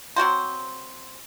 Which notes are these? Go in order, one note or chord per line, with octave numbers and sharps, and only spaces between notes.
F#3 C4 F#4 C5